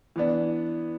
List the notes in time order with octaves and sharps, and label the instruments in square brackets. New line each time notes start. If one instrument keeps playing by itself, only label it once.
[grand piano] E3 B3 D4